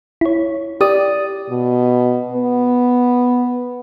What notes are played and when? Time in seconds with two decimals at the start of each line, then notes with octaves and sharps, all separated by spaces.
0.21 E4 C#5
0.81 G4 D5 D#6
1.50 B2
2.32 B3